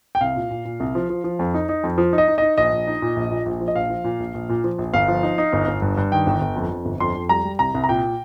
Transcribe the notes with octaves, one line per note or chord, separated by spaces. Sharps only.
G5
C2 F5
A#2
A#2
A#2
C2
F3
F3
F3
F2
D#4
D#4
F2
F3
D#4
D#5
D#4
D#4 D#5
A#1 D#5
A#1
D#4
A#2
A#1
A#2
A#1
F3
D#5
A#1 F5
F3
A#2
A#1
A#1
A#2
F3
A#1
G1 F5
F3
D#4
D#4
G1
G1
G2
G2
D#3 G5
G1
G1
F2
F2
G1
F2 C6
F2
G3 A#5
G3
C2 A#5
C2
A#5
A#2 G5